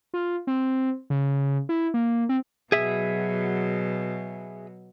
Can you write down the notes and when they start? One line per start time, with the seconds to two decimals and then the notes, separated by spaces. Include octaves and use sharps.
0.14 F4
0.47 C4
1.10 C#3
1.69 E4
1.94 A#3
2.29 C4
2.72 B2 F#3 G#4 E5